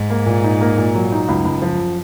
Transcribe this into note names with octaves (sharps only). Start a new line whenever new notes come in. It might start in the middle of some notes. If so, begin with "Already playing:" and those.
Already playing: G#2
A#3
A#2
D#4
A#3
A#2
F#3
D#4
C#2 F#2
C#2
F3